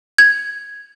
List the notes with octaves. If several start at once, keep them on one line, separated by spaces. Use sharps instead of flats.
G#6